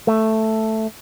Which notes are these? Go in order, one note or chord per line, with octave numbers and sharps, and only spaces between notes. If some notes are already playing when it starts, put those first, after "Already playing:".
A3